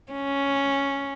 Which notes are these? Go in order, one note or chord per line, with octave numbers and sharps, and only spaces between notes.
C#4